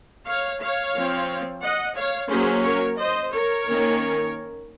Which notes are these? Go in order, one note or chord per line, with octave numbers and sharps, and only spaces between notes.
C#5 F5
C#5 F5
F3 C4
D#5 F#5
C#5 F5
F#3 A#3 C#4 G#4 C5
A#4 C#5
C5 D#5
A#4 C#5
D#3 A#3 C#4